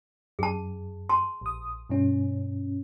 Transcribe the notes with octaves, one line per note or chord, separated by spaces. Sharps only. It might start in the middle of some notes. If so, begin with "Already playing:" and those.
F#2 G#4 A5
A5 C6
A#1 D#6
G2 B2 C#4